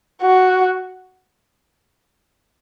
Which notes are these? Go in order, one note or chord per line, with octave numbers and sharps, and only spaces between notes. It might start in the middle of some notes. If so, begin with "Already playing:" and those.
F#4